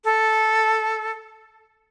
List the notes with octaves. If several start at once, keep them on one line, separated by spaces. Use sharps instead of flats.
A4